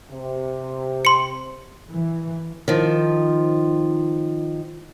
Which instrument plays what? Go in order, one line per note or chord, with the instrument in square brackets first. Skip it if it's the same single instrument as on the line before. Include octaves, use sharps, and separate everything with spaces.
[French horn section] C3
[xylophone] C6 C#7
[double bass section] E3
[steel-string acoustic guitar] D#3 F3